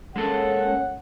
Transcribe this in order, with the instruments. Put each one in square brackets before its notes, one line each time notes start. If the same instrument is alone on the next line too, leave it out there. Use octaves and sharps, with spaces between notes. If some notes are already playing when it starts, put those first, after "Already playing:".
[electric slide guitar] G#3 A#3 A4 [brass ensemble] C#4 F#5